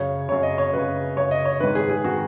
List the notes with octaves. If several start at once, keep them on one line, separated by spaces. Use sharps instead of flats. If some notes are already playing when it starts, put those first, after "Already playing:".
Already playing: F#2 C#3 C#5
F#2 C#3 C#5
D#5
C#5
F#2 C#3 B4
F#2 C#3 C#5
D#5
C#5
G#2 D#3 B4
G#4
G#4
D#3 F#4